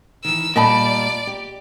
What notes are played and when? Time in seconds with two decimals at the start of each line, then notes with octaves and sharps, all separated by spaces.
0.25 D#3 E3 E6
0.56 A#2 G3 D5 D#5 A5 B5
1.27 G4